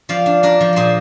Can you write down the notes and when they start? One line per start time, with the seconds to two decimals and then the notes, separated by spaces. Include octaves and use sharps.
0.09 F3 D5 F5
0.26 D4
0.43 D4 A#4 D5
0.61 F3
0.73 A#2 G#4 C5 D5